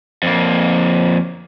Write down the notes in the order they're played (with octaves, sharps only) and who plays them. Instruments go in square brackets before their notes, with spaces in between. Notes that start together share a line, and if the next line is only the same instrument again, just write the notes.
[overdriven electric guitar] F2 A#3